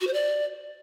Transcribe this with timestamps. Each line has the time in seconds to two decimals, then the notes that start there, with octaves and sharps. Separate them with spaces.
0.01 F#4
0.07 C5
0.13 D5